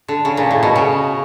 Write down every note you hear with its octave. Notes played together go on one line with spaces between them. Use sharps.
D3
C#3
A#2
A2
B2
C#3